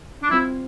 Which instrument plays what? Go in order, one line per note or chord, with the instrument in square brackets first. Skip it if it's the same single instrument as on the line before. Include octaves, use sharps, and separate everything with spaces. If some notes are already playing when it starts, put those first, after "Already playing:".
[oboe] D4
[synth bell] G3 C4 F4 C5 [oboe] E4